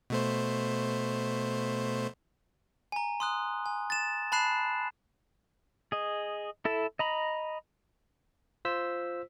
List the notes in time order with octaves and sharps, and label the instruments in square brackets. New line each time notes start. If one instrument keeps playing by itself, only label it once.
[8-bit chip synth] B2 A3 C5
[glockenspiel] G#5 A#5
C6 D#6 F#6
G#5
A6 E7
A5 B5 F#6 C7 E7
[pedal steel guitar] G#4 D#5
E4 A4 A5
D#5 A#5 B5
[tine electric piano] F4 C5 E6 B6